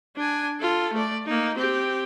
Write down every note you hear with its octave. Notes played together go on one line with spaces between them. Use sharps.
D4 G#5
F4 A4
A3 D5
A#3 D#4
C4 G4